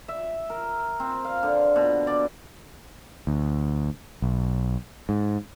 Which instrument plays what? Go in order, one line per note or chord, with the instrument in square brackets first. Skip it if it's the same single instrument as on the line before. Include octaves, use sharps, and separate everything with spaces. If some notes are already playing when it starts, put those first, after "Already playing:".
[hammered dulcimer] E5
A#4
C4
F5
D3
B2
D5
[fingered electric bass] D2
B1
G#2